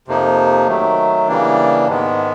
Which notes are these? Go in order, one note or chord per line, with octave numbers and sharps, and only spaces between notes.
F2 C3 F3 A#3 D#4
D#3 F#3 A3
C#3 E3 G3 A#3 D4
G#2 D#3 G#3 B3